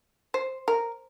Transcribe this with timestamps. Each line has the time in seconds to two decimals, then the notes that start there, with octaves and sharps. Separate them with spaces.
0.34 C5
0.68 A#4